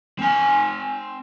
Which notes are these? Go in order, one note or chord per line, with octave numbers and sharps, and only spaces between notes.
C4 G#5